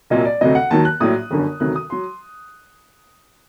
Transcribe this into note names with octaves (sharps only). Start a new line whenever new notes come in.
C2 A#2 F#3 D#5
D5
D2 C3 F#3 D#5
F#5
D#2 D#3 F#3 A5
F#6
A#1 A2 F#3 D#6
G1 F#2 D3
D2 C3 D#3 F#3 F#6
D#6
F#3 C6